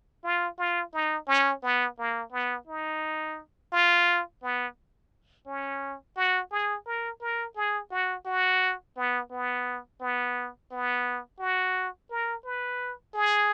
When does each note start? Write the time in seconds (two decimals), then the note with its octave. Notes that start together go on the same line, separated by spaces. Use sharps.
0.24 F4
0.58 F4
0.93 D#4
1.28 C#4
1.63 B3
1.99 A#3
2.32 B3
2.67 D#4
3.72 F4
4.42 B3
5.47 C#4
6.16 F#4
6.51 G#4
6.86 A#4
7.21 A#4
7.56 G#4
7.91 F#4
8.26 F#4
8.97 B3
9.31 B3
10.01 B3
10.71 B3
11.40 F#4
12.11 A#4
12.44 B4
13.14 G#4